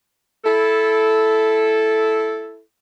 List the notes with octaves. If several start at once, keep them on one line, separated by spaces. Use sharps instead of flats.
E4 A4